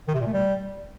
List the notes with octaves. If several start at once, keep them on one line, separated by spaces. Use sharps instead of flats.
D#3
C3
A#2
A3
G3